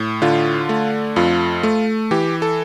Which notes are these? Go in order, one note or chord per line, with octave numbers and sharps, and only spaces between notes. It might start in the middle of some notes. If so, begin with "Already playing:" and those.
Already playing: A2
D3 F4
A3
F2 F4
A3
E3 G4
A4